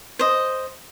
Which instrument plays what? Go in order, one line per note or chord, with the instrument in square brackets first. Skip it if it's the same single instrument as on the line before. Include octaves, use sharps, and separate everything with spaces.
[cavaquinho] C5 D#5